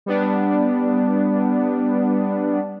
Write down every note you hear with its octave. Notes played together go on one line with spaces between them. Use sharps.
G3 B3 D4